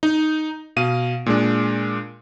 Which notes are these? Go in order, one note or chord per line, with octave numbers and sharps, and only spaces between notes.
D#4
B2 F5 D#7
A#2 G#3 D4